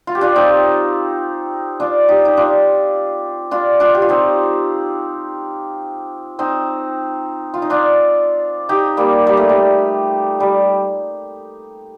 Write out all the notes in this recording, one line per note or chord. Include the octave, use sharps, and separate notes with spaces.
F4
G4
D4 F4
C4 D#4
D4 F4
D#4 G4
D#4
D4 F4
D4 F4
D4 F4
G4
F4
C4 D#4
C4 D#4
F4
D#4
D4 F4
D#4 G4
G3 A#3
G3
A3
G3
G3